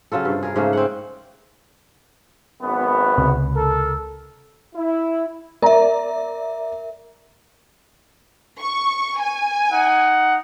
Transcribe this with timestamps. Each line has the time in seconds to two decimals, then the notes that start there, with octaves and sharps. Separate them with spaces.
0.12 C#3 F#3 F4 A4
0.25 G2 C3
0.43 G#4 A#4
0.56 G#2 C#3 A3 A#3
0.73 C4 C#4 F#5
2.61 G#1 F#2 B3
3.18 C#2 C3
3.54 A4 A#4
4.75 E4
5.62 A#4 D5 E5 A#5
8.60 C#6
9.20 G#5
9.73 D#4 F#5